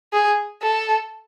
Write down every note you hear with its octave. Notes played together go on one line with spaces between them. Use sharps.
G#4
A4